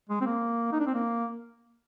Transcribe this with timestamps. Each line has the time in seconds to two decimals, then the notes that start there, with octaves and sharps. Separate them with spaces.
0.09 G#3
0.21 C4
0.26 A#3
0.72 D#4
0.80 D4
0.86 C4
0.94 A#3